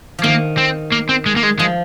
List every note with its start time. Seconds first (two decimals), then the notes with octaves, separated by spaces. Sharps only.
0.19 F3
0.24 D#3 A#3
0.58 C4
0.92 A#3
1.09 C4
1.26 G#3
1.36 A#3
1.43 G#3
1.59 F3 G#3